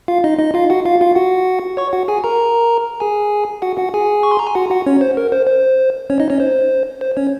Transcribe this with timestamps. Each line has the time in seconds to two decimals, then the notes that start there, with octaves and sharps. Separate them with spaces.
0.08 F4 F5
0.24 D#4 D#5
0.39 D#4 D#5
0.54 F4 F5
0.70 F#4 F#5
0.85 F4 F5
1.01 F4 F5
1.15 F#4 F#5
1.77 C#5 C#6
1.93 F#4 F#5
2.08 G#4 G#5
2.24 A#4 A#5
3.00 G#4 G#5
3.62 F#4 F#5
3.78 F#4 F#5
3.94 G#4 G#5
4.23 C#6
4.31 C6
4.39 A#5
4.47 G#5
4.55 F#4 F#5
4.70 F#4 F#5
4.86 C#4 C#5
5.01 C5
5.17 A#4
5.32 C5
5.47 C5
6.10 C#4 C#5
6.20 D#4 D#5
6.30 C#4 C#5
6.40 C5
7.01 C5
7.17 C#4 C#5